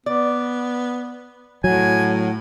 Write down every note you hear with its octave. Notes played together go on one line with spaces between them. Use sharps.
B3 D5
A2 F#3 G#5